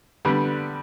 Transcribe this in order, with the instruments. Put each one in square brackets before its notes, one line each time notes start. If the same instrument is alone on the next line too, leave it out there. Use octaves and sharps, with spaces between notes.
[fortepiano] D3 G3 B3